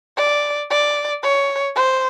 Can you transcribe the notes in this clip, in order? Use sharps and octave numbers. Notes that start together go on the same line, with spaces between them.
D5
D5
C#5
C5